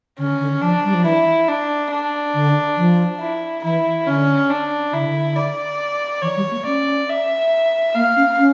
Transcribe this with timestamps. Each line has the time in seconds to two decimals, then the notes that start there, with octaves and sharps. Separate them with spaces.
0.19 D3 C#4
0.40 D3
0.61 F3 D4
0.84 G3
0.94 F3
1.05 E3 E4
1.48 D4
1.91 D4
2.34 D3
2.77 F3
3.20 E4
3.64 E3 E4
4.06 D3 C#4
4.50 D4
4.92 D3 E4
4.99 C#3
5.07 D3
5.36 D5
6.22 E3 C#5
6.36 G3
6.51 A#3
6.65 C#4 D5
7.09 E5
7.95 A#3 F5
8.16 C#4
8.38 C#4